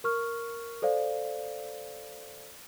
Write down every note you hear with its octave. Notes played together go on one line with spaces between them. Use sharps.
A#4 C#6 F6
A4 C5 D5 F5